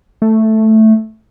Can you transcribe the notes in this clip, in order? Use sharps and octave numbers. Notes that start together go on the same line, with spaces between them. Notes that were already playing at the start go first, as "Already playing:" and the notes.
A3